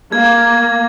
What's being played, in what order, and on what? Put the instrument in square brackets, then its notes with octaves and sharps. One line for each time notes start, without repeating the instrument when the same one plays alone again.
[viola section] A#3 [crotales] G#6